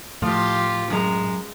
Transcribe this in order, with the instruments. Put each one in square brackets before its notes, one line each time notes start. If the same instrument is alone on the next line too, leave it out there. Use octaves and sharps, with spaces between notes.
[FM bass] A2 [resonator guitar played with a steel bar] F3 [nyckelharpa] F4 G4
[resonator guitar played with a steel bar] F#2 A#5 [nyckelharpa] G#3